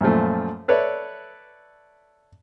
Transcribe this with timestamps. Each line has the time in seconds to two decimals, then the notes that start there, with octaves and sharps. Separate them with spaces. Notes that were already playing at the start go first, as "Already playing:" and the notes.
0.01 F#2 A#2 F3 A3
0.68 A4 B4 C#5 D5 E5